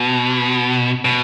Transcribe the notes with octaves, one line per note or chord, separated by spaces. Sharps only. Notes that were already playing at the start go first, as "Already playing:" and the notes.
Already playing: B2
B2